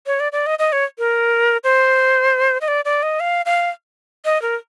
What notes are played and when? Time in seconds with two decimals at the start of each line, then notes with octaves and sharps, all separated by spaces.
0.06 C#5
0.20 D5
0.32 D5
0.46 D#5
0.59 D#5
0.72 C#5
0.99 A#4
1.64 C5
2.61 D#5
2.68 D5
2.85 D5
3.03 D#5
3.20 F5
3.46 F5
4.25 D#5
4.42 A#4